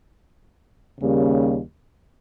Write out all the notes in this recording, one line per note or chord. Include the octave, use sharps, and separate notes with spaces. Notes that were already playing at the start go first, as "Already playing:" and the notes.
D#2 C#3 G3 A#3